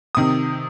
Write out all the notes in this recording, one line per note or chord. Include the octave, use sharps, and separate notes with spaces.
C3 D#3 D#6